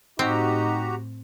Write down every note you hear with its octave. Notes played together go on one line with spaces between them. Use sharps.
A2 C4 D#4 F#4 G4 A#5